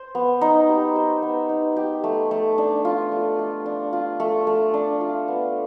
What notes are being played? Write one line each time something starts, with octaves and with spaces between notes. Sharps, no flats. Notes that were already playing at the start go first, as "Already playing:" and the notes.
Already playing: C5
B3
D#4
G4
C5
B3
D#4
G4
A3
A3
D4
F4
A3
A3
D4
F4
A3
A3
D4
F4
B3